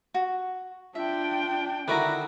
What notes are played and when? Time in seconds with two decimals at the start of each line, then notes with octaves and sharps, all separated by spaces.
0.14 F#4
0.95 D4 F4 E5 G5
1.88 D3 D#3 E4 F#4 B4 D5 E5 A#5